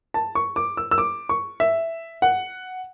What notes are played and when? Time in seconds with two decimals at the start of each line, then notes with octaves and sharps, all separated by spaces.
0.14 A5
0.35 C#6
0.56 D6
0.77 E6
0.91 E6
0.98 D6
1.29 C#6
1.60 E5
2.22 F#5